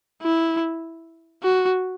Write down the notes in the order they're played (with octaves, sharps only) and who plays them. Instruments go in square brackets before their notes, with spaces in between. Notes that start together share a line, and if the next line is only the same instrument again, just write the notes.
[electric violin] E4
F#4